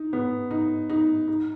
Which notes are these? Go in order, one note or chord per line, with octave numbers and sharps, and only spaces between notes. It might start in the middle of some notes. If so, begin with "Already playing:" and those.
Already playing: D#4
B3
D#4
D#4
D#4